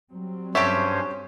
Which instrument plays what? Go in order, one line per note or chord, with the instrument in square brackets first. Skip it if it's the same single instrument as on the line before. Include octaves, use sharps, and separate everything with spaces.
[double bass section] F#3 G3 C4
[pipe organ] G2 C#4 C5 [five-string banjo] G4 A4 E5 [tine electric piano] C#5